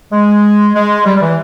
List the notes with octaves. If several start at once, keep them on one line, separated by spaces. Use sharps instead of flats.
G#3
G#3
G3
G3
E3